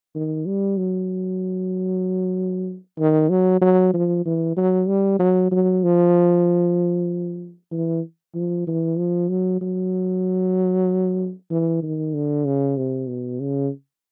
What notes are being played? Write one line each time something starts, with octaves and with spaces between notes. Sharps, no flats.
D#3
G3
F#3
D#3
F#3
F#3
F3
E3
F#3
G3
F#3
F#3
F3
E3
F3
E3
F3
F#3
F#3
E3
D#3
D3
C#3
C3
B2
C#3